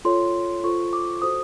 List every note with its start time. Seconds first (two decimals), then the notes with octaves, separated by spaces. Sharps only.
0.05 F4 A4 C#5 C6
0.64 F4 A4 C5 C#6
0.93 D6
1.22 F#4 A4 C5 D#6